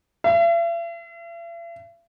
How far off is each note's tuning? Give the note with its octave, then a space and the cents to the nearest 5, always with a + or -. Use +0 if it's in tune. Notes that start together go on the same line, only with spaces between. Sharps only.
E5 +45